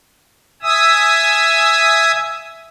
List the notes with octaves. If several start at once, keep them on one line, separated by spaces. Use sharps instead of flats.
E5 G#5 D#6 E6